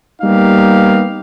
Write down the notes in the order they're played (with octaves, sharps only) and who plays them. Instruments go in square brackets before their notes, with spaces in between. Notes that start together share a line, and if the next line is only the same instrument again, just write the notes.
[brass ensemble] G3 A#3 B3 D#4 G4 F5